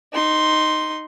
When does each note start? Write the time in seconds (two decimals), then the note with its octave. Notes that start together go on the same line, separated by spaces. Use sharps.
0.13 D#4 C6